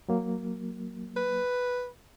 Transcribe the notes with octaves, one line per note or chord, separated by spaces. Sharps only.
F#3 A#3
B4